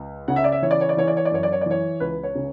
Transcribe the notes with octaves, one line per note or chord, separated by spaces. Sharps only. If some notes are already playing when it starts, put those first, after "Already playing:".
Already playing: C#2
C#3 F#5
E5
D5
E5
E3 C#5
D5
C#5
D5
E3 C#5
D5
C#5
D5
F#2 C#5
D5
C#5
D5
E3 C#5
C#2 B4
C#5
C#3